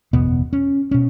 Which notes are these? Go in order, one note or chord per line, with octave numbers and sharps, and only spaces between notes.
F#1 E2 B2 B3
C#4
B2 C#4